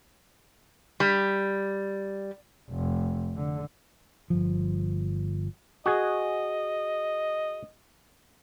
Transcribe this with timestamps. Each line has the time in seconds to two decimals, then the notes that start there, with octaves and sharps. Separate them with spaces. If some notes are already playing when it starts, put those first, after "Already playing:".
1.00 G3
2.71 F1
3.36 D3
4.30 G1 F3
5.86 F#4 G#4 D#5